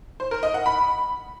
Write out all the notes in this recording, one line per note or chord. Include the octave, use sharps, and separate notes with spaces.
C5
A#4
D#5
F#5
B5